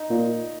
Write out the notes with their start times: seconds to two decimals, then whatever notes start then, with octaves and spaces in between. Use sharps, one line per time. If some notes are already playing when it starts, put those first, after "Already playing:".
Already playing: D#4
0.10 A#2